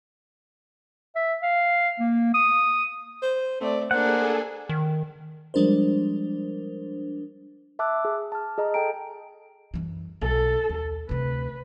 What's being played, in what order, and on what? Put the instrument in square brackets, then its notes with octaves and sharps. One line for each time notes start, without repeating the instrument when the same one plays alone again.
[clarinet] E5
F5
A#3
D#6
[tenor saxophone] C5
[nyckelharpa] A3 D5 [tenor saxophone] C4
[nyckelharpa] A#3 D4 [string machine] G#4 A4 G#5 [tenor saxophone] C5 [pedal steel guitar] F#5
[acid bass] D#3
[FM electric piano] F3 G3 G#3 D4 A#4 C5
[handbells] E5 A5 D6 E6 F#6
G#4
A5 F6
G#4 D#5 A5 A#5 F6
A4 G5 G#5 A#5 D7
[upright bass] F#2 E3
[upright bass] B1 [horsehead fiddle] A4
[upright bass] D#2
[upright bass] D2 C3 [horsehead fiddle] B4